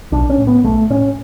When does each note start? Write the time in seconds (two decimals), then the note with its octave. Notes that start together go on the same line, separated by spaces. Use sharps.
0.12 B1 D4
0.30 C#4
0.38 A2
0.47 B3
0.63 B1 A3
0.90 A2 C#4